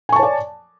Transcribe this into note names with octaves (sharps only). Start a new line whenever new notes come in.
C#5 D5 G#5 A5 C#6